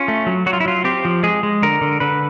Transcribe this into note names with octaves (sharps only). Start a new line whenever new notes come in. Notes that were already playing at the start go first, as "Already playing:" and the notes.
Already playing: C#4 F4
A3
F#3
F#3 F#4
F4
E4
F#3 F4
C4 G4
F3
G#3 G#4
G#3
D3 A#4
D3
D3 B4